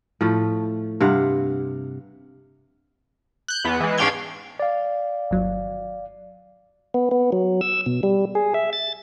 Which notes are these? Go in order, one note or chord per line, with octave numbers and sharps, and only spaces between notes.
A2 F3 A3
G2 C3 F5 F#5
F#6 G6
E2 B3
E3 G#3
G#2 C#4 D4 F5 G5 G#6
D5 F5
G1 D#2 F#3
B3
B3
F#3
E6
B2
G3
G#4
E5
A6